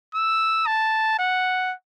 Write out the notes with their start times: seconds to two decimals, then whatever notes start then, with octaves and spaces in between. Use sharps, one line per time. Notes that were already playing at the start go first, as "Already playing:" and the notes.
0.15 E6
0.67 A5
1.19 F#5